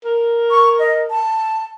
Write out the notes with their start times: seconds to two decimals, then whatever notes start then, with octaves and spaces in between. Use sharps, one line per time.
0.05 A#4
0.51 C#6
0.79 D#5
1.10 A5